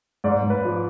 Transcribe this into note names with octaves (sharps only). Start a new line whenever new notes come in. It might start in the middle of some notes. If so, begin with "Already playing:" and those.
G#2 D5
G#2
B4
F3